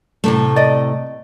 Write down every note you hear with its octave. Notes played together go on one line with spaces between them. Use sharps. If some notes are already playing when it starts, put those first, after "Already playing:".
A2 C3 A3
D5 D#5